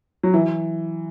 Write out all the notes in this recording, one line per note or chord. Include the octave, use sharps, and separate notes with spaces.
F#3
E3